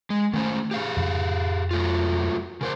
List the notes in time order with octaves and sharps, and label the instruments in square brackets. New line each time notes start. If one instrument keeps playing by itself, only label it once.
[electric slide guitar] G#3
[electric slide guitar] D#3 C#4 C5 [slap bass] A3
[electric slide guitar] G4 G#4 F5
[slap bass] F2 C#3
[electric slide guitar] F#3 A3 F4
C#3 A#4 C5